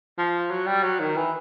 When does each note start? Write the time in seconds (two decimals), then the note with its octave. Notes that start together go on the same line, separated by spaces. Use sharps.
0.18 F3
0.50 F#3
0.67 G3
0.84 F#3
1.00 D#3
1.16 E3